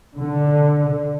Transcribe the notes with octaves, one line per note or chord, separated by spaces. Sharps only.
D3